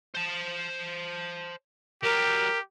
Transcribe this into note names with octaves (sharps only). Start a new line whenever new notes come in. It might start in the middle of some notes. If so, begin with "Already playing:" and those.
C5 A5
F#3 G3 G4 A#4